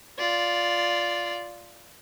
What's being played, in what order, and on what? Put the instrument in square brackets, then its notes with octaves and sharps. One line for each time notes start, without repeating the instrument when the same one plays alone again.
[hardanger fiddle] F4 D5